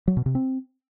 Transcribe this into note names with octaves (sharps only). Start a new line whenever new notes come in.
F#3
B2
C3
C4